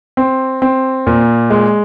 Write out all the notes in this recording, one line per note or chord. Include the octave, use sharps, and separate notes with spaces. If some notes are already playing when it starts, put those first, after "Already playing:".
C4
C4
A#2
G#3